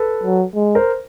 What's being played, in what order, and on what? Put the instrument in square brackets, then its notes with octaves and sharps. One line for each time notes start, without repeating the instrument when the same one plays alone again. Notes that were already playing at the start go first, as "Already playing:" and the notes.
Already playing: [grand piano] A4 B4
[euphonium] F#3
G#3
[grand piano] A#4 C5